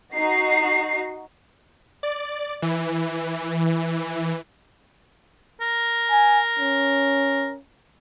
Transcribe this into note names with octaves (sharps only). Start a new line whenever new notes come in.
D#4 F#4 C7
D5
E3
A#4
G#5
C#4